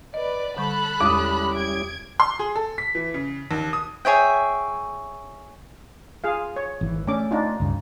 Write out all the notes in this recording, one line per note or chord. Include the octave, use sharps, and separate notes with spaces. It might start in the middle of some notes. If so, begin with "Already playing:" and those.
B4 D5 D#5
D3 G3 A4 B5 C#6 F#6
E2 G3 G#3 C#4 E4 D6 D#6
G#6 D7
C6
G#4
A4
B6
E3
C#3
D#2
D#6
G#4 C#5 E5 G5
F4 G#4 F5
C#5
G#1 E3
A3 C#4 D4 D6
D4 D#4 F4
C#2 G2 C#3